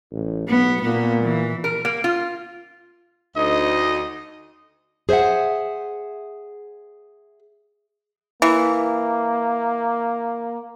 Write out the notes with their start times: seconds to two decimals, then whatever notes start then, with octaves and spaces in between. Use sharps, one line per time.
0.12 A1
0.49 B1 B3
0.82 A#2 A#3 B3
1.23 E3
1.64 A#4
1.85 A#3
2.04 F4
3.36 D2 D#4 D#5
5.09 G#4 C5 D#5 E5 F#5
8.42 E3 A#3